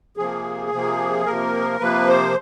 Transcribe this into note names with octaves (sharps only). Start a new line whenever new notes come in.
C3 F3 A#3 G#4
C3 F3 A#3
C3 F3 A#3 A#4
C3 F3 A#3 B4
C5